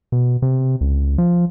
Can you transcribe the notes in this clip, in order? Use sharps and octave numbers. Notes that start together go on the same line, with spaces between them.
B2
C3
C#2
F3